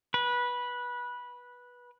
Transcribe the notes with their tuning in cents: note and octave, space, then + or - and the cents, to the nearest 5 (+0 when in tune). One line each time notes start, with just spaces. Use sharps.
B4 -15